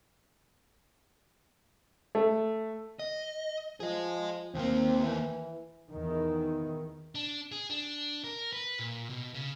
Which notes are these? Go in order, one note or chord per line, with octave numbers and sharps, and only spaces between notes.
A3
D#5
F3 G#4 D#5
D#2 A#3 C4
E3
E2 D#3
D4
G#4
D4
A#4
B4
A#2
B2
C#3